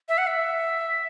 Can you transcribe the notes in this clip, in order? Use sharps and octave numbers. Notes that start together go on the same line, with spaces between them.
E5
F#5
E5